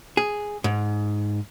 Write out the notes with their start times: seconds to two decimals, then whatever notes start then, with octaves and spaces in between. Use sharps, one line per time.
0.17 G#4
0.64 G#2